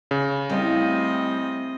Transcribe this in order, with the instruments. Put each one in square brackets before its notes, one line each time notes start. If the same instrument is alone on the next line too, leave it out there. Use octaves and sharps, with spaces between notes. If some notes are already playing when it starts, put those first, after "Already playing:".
[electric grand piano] C#3
[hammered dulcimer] A2 F5 A5 [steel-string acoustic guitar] G3 [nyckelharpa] C4 D#5